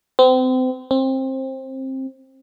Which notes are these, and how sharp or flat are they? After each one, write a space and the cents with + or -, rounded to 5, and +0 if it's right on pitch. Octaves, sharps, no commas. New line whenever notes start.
C4 -30
C4 +20